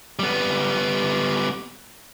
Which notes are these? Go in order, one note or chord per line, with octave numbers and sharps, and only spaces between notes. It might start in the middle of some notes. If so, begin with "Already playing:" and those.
G3 B3